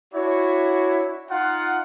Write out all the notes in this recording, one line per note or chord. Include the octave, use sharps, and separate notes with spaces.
D4 E4 F#4 C#5
D#4 F4 F#5